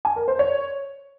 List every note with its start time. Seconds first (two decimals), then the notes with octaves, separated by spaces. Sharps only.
0.05 G#5
0.16 A#4
0.28 C5
0.39 C#5